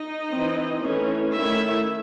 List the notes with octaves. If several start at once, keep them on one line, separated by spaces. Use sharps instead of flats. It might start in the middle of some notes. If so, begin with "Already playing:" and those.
Already playing: D#4 D#5
E3 C4
E3 A3 C#4
D#3 A3 C#4 E4 E5